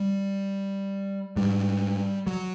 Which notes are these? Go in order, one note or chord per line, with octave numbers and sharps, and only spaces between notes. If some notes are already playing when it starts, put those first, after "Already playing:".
Already playing: G3
G#2 G3
F#3